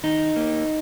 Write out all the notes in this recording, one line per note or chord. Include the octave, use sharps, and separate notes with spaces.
D#3 D#4
A#3